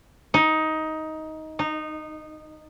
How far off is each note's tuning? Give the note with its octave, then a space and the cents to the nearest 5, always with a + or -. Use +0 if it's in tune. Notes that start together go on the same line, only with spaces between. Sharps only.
D#4 +15
D#4 -15